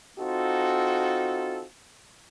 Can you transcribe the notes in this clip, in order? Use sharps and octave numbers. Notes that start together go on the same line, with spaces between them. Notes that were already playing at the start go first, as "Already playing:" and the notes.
C4 D#4 F4 F#4 A4